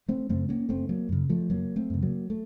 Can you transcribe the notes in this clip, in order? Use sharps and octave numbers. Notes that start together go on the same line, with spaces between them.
A3 C4
F#2 C#3 A3 C4
A#3 C#4
F#1 A3 C4
F#3 A#3
F#2 C#3
F3 A3
F#1 F#3 A#3
A3 C4
F#2 C#3
F#3 A#3
A3